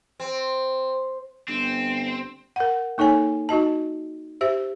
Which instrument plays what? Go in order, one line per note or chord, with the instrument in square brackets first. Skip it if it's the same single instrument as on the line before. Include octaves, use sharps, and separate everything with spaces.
[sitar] C4
[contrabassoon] G1 [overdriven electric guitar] C4
[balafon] A#4 F#5
A#3 D#4 A4 C#5 G#5
D#4 F#4 D#5 A5
G4 C5 E5